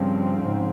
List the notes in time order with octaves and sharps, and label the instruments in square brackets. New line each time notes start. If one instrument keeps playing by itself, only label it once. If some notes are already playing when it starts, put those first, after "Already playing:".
Already playing: [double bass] G2 [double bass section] C#3 F3 C4
[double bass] G#2